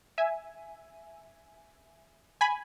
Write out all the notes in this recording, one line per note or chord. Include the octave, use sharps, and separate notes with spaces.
E5 G#5
G#5 B5